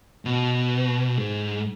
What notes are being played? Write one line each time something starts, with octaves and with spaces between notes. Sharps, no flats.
B2
G#2